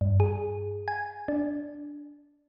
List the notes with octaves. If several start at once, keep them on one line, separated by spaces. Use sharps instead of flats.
G2
G#4
G#5
D4